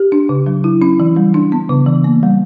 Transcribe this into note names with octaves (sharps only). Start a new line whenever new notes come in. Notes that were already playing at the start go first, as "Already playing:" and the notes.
Already playing: G4
D4
C#3
F#3
E4
C#4
E3
G3
D4
B3
C#3
E3
A#3
G3